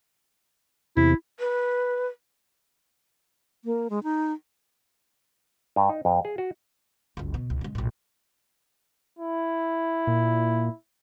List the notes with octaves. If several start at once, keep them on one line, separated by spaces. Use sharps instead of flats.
E2 C3 E4
B4
A#3
G#3
D#4
G2
D#4
F2
G#4
F#4
F#1 C#2
B2
C#2
C#3 G#3
A#1 A2
E4
A#2